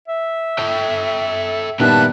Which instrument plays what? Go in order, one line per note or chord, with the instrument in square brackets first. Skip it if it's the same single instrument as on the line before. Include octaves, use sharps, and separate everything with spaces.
[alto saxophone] E5
[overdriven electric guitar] A4 G5
[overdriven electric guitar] A#2 E4 [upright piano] D#3 G3 B3 [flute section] A5 F#6